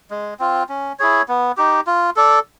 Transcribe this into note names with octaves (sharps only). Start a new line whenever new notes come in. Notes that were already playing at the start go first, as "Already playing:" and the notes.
G#3
C4 F4
C#4
E4 G#4 C#5
B3
D#4 G4
F4
A4 D5